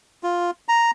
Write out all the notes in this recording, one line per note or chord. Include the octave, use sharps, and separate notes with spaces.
F4
A#5